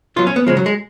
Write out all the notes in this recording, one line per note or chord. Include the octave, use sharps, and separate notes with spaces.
B2 F#3 F4
C#4
B3
C#3 F3 G#3
F#3
G#3